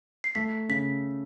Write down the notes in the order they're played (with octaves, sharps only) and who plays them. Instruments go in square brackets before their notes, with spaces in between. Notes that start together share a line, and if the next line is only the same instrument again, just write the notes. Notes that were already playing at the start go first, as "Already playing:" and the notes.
[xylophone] C7
[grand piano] A3 [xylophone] B6
[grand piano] C#3 [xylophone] B6